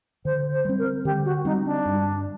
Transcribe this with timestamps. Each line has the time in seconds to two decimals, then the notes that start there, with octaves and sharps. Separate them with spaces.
0.25 D3 C5
0.53 C5
0.65 G3 C4
0.79 A#4
1.05 D3 G4
1.25 F#4
1.45 G3 C4 D#4
1.65 D4
1.85 G2